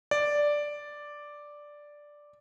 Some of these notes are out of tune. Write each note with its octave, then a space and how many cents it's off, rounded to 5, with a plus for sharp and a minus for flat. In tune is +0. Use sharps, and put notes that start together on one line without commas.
D5 +0